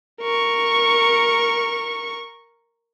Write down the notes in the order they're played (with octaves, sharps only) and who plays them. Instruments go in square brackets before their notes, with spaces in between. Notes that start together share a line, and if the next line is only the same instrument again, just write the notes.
[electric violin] A#4 C#6